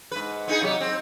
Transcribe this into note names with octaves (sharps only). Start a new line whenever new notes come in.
G#2 B4
B3 D#4 G#4
C3 F#3 G4
C4